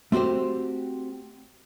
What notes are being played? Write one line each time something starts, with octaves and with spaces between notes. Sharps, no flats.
A3 C4 F#4 G4 C5